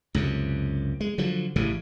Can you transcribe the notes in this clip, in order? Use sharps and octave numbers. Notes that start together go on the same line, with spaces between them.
C#2 F#2 C3
G#3
D3 F3 F#3
A1 A2 C#3 E3